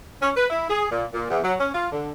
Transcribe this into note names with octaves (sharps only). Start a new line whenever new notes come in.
C#4
B4
E4
G#4
A#2
A#2
E2
F#3
C#4
F4
D3